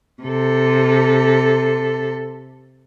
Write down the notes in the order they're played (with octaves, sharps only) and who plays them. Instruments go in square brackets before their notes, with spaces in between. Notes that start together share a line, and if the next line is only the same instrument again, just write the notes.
[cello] C3 A4